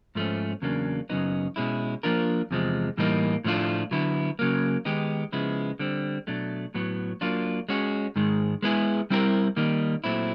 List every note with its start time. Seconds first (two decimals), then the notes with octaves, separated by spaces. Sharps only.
0.15 G#2 F3 A3 C#4
0.62 E2 C#3 F#3 A#3 D4
1.09 F#2 C#3 F#3 B3 D#4
1.56 B2 G#3 C#4 E4
2.03 F3 A#3 D4 F4 A#4
2.51 E2 C3 F3 G#3
2.97 A2 E3 G3 A#3 D#4
3.44 A2 F3 A3 D4 F4
3.91 D3 F#3 B3 E4
4.39 C#3 F#3 A#3
4.85 D#3 G#3 B3 D#4 G4
5.32 C#3 F3 G#3 B3 E4
5.79 D3 G3 C4
6.27 B2 F#3 A3 D4
6.74 A2 F#3 B3
7.21 F#3 A#3 D4 F4
7.69 G#3 C#4 F#4
8.16 G#2 D#3 G#3
8.62 G#3 B3 E4 G#4
9.10 G3 C4 E4 G4 A#4
9.56 D#3 G3 A#3 D#4
10.04 A#2 F#3 A3 C4 E4